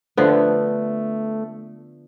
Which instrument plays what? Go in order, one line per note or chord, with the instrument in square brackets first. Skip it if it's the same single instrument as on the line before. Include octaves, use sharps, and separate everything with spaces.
[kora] D3 F3 B3 [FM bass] A3